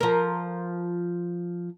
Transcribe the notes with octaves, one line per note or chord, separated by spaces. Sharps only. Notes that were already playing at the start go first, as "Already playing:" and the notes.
F3 A#4